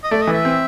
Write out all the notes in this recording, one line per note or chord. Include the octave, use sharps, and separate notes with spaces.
D#5
A3 D5
D#5
E3
E5
C4